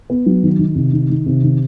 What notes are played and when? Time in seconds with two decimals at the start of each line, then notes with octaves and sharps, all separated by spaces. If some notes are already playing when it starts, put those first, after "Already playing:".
0.10 B3
0.26 F#3
0.43 D#3
0.59 D#3
0.76 C3
0.93 D#3
1.10 D#3
1.26 C3
1.43 D#3